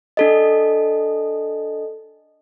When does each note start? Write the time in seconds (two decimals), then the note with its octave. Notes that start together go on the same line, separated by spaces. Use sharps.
0.17 D4 A4 D#5